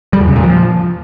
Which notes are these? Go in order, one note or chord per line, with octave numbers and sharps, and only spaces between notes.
G3
E2
C#3
A#2
F3